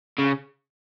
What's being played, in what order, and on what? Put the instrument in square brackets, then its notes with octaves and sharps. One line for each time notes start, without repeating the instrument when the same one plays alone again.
[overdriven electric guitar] C#3